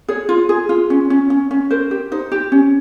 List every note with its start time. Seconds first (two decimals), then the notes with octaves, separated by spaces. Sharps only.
0.08 G#4 C#5
0.29 F4
0.49 G#4
0.69 F4
0.90 C#4
1.10 C#4
1.30 C#4
1.51 C#4
1.71 A#4 C5
1.91 G4
2.12 D#4 C5
2.32 G4
2.52 C#4